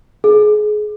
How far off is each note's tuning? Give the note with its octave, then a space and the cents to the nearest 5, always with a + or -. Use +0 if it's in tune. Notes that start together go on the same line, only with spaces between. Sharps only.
G#4 +25